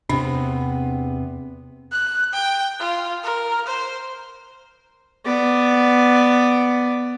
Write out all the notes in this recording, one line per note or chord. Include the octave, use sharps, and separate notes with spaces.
E2 C3 B3 D4
F#6
G5
F4
A#4
C5
B3 D5